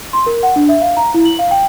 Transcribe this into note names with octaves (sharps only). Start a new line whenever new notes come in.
C6
A#4
F#5
D4
E5
F5
A#5
E4
F#7
F5
G5